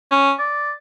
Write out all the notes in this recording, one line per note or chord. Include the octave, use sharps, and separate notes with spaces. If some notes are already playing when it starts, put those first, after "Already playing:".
C#4
D5